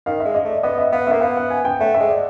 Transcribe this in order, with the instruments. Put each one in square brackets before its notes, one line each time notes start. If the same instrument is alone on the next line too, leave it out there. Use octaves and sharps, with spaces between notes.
[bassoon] D#3 [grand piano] F5
[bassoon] G#3 [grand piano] E5
[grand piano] D#5
[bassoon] A3 [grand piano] D5
[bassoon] B3 [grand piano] D#5
[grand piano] E5
[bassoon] B3 [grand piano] F5
[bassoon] A#3 [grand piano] E5
[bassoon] B3 [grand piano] F5
[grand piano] F#5
G#5
G5
[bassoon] A3 [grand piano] F#5
[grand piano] E5
[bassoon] G#3
[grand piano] D5